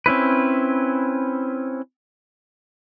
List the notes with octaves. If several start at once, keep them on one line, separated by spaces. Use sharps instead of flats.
C4 C#4 E4 B4